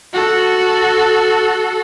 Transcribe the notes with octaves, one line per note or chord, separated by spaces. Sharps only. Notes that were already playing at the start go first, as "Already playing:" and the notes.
F#4 A4